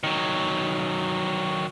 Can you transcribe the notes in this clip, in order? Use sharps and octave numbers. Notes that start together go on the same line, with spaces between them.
D#3 F#3